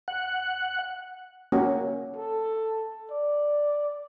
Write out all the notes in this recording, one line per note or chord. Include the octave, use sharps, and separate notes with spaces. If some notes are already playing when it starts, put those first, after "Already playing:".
F#5
A#3 C#4 F#4
A4
D5